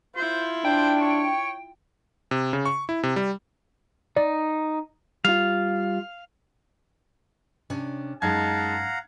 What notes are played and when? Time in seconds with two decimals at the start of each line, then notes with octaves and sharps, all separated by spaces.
0.16 E4 F4 C5
0.65 D4 C5 G5
1.01 C#5
2.31 C3
2.53 C#3
2.66 C#6
2.89 E4
3.03 C3
3.16 G3
4.17 D#4 D5
5.25 G3 F4 F5
7.70 C3 C#4 D4
8.22 F#2 G#3 D#4 F5 F#5 A5 A#5 G#6